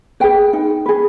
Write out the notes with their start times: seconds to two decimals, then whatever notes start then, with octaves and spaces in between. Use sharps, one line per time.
0.20 G#4 B4 G5
0.53 D#4
0.86 G#4 B4